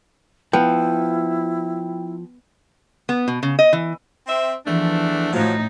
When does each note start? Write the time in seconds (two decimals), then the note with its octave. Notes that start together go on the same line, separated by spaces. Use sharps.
0.53 F3 B3 E4 G5
3.09 B3
3.28 B2
3.43 C#3
3.59 D#5
3.73 E3
4.27 C4 E5
4.66 E2 E3 F3 A3 D4
5.32 A2 F3 F#3 D#4